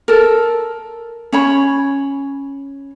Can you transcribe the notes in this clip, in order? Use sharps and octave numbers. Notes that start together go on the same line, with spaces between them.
A4 A#4
C#4 C#5 B5